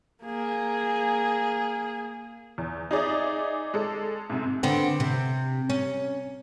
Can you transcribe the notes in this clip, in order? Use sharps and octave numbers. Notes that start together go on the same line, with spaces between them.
A#3 G#4
E2
D#4 G#4 D5 E5
G#3 A4
G#2 C3
D3 B3 C4
C3
C#4